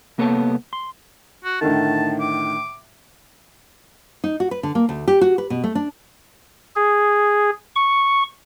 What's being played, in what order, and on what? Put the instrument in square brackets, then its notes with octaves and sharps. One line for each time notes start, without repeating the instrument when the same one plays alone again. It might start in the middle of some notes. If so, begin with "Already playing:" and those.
[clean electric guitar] C2 A#3 B3 A4 C#5 A5
C6
[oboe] F#4
[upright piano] A2 D3 D#3 [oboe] A5
[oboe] D6
[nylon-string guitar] D#4
F#4
B4
D3
A#3
D2
G4
F#4
B4
B2
A3
D4
[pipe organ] G#4
C#6